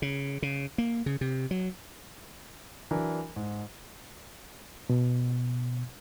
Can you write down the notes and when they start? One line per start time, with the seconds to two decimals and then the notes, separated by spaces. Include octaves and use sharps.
0.02 C#3
0.42 C#3
0.78 A#3
1.06 C#3
1.21 C3
1.51 F#3
2.91 E3 F#3 D4 A#4
3.36 G#2
4.90 B2